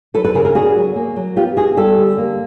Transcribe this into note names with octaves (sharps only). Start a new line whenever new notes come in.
F#3 A4 B4
A4 B4
C#3 G#4 A#4
G#4 A#4
D4 F#4 G#4
F#3
A#3
F#3
B3 F4 G4
D#4 F#4 G#4
G3 G4 A4
D3
A#3